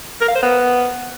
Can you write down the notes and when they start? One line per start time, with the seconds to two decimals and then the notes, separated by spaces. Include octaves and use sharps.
0.21 A#4
0.28 F5
0.35 C5
0.43 B3